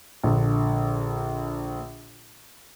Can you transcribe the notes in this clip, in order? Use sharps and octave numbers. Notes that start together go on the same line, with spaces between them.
A#1 D3